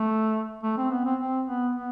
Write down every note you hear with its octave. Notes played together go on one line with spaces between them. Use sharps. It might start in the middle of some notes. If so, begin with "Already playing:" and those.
Already playing: A3
A3
C4
B3
C4
C4
B3
B3